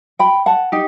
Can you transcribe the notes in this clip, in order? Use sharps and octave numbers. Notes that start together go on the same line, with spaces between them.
G5 B5
F#5 A5
D#4 G4